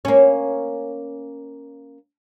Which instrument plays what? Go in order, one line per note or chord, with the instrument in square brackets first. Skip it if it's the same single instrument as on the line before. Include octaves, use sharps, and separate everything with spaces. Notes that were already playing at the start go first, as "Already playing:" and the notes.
[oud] A#3 C#4